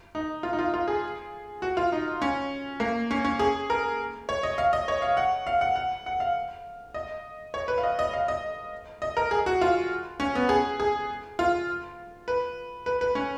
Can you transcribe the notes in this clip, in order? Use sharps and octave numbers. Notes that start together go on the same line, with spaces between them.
D#4
F4
D#4
F4
F4
G#4
F#4
F4
D#4
C#4
A#3
C#4
C#4
G#4
A#4
C#5
D#5
F5
D#5
C#5
F5
F#5
F5
F#5
F#5
F#5
F5
D#5
C#5
B4
F5
D#5
D#5
F5
D#5
D#5
A#4
G#4
F#4
F4
C#4
B3
G#4
G#4
F4
B4
B4
B4
C#4